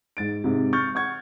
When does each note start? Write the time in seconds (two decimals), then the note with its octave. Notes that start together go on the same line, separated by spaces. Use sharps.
0.17 G#2 A6 D7
0.44 G#2 C3
0.73 C#6 F6 G6 A6
0.95 F#5 C#6 G#6